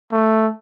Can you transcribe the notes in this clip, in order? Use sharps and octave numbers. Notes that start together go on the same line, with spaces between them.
A3